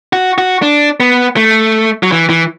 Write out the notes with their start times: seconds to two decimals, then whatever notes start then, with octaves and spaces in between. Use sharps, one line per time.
0.13 F#4
0.38 F#4
0.62 D4
1.00 B3
1.36 A3
2.03 F#3
2.12 E3
2.30 E3